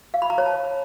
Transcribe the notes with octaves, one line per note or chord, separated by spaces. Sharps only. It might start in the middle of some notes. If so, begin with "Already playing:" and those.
F5
B5
A#5
C#5
A5